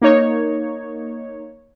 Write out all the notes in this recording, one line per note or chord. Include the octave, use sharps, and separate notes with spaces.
A#3 D#4 C#5